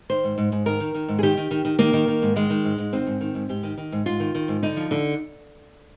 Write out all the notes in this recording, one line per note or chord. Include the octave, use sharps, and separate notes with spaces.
D#3 C5
G#2
G#2
G#2
D#3 A#4
D#3
D#3
G#2
G#4
D#3 G4
D#3
D#3
D#3
D#3 A#3
D#3
D#3
G#2
D#3 G#3
D#3
G#2
G#2
D#3 C4
G#2
D#3
G#2
G#2 G4
D#3
D#3
G#2
G#2 F4
D#3
D#3
G#2
D3 D#4
F3
D3